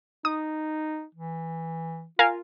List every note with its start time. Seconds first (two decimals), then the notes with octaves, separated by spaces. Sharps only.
0.25 D#4 D#6
1.15 E3
2.19 F4 A#4 F5 G#5